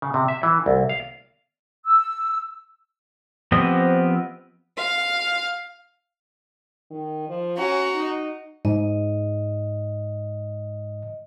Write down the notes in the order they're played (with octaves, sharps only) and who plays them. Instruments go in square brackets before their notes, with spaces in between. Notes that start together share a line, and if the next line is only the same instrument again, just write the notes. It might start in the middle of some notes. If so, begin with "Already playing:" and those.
[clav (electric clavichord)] C#3
C3
E5
E3
C2
F5
[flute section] E6
[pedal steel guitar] F3 B3 C4 G4 D#5
[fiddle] F5
[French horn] D#3
F3
[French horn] C#4 [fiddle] F#4 A#5
[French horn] D#4
[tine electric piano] G#2 [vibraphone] D#5